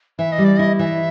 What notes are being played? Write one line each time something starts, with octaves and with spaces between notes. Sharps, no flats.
E3 E5
D#5
G3
D5
E4 D#5
E3 E5